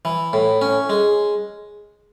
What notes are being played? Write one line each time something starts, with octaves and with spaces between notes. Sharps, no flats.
E3
A2
C#4
G#3